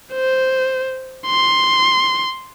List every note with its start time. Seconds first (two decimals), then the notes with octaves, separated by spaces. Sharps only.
0.13 C5
1.27 C6